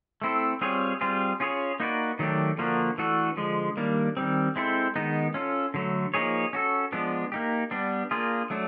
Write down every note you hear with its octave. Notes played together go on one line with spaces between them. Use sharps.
A3 C4 E4 A4
G3 C4 F4 G#4 C#5
G3 C4 F4 G#4
C#4 F4 G#4 C#5
A#3 D#4 F#4 B4 D5
D#3 F#3 A3 D4 G4
D3 F3 A#3 D4 F#4
E3 A3 D4 F#4 A4
D3 F3 G#3
D#3 G3 A#3 D4
D#3 G3 C4
G#3 C4 E4 A4 C5
D#3 G#3 B3 D#4
C#4 F4 A4
D3 F#3 A3
F3 A#3 D#4 G#4 C#5
C#4 F#4 A4
F3 G#3 B3 D4
A#3 D#4 G4
G3 B3 D4
A#3 D4 F4 G#4
F#3 A3 D4